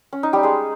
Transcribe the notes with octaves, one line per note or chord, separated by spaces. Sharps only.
C#4
D#4
G3 G4
G#3 G#4